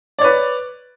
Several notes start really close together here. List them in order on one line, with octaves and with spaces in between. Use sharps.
D5 C#5 B4